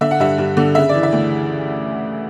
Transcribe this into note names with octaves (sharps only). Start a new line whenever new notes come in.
D3 E5
F#5
G2 E5
G2
D3
C#3 E5
E3 D5
E5
D2